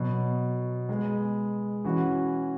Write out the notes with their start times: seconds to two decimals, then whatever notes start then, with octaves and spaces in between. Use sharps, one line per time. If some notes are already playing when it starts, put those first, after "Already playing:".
Already playing: B2 F#3 B3
0.89 G#3 B3 G#4
1.84 E3 C#4 F#4